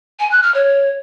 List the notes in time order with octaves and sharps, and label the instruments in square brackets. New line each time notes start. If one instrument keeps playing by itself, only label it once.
[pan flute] G#5
F#6
F6
C#5